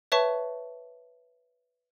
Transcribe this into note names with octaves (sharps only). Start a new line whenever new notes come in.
B4 C#5 E5 A5 C#6